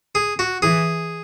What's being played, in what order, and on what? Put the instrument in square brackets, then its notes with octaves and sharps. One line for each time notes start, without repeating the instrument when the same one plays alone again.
[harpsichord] G#4
F#4
[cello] E3 [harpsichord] G#4